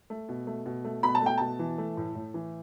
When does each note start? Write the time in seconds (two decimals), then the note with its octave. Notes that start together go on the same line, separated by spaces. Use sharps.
0.10 A3
0.29 B2
0.47 A3
0.66 B2
0.84 A3
1.03 B2 B5
1.15 A5
1.22 A3 G5
1.38 B2 A5
1.59 E3
1.78 A3
1.97 A2
2.15 A2
2.34 E3